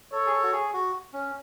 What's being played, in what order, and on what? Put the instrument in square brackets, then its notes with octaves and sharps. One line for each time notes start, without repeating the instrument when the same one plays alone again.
[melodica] A4 [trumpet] C#5
[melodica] G#4
A4
F#4
G#4
F#4
C#4